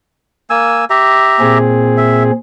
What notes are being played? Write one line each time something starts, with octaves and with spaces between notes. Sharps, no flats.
A#3 G#5 E6
G4 E5 A#5
A#2 C4 G#4
E5